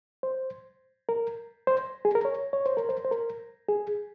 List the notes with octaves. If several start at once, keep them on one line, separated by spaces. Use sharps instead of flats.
C5
A#4
C5
G#4
A#4
C#5
C#5
C5
A#4
C5
C5
A#4
G#4